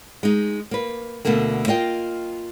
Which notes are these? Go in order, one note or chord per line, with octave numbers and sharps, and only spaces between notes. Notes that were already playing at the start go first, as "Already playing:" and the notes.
G#3 D#4
A#3 B4
D2 B2 D3 A3 A#3
A#3 F4 D#5 G5